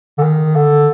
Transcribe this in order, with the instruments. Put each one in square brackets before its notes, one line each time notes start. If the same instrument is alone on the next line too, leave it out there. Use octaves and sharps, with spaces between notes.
[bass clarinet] D3
D#3
D3